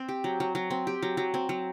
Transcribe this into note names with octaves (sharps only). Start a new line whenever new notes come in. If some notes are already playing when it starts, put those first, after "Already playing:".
Already playing: C4
G4
F#3
F#3
F#3
C4
G4
F#3
F#3
C4
F#3